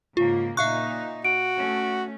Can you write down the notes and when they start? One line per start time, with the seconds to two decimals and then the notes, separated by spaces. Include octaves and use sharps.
0.17 G#2 C#3 A#3 F4
0.57 A#2 D#4 E5 F5 C#6 F#6
1.25 F#4 D7
1.58 A3 C#4